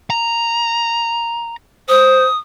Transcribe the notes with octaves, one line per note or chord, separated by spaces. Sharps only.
A#5
C5 D#6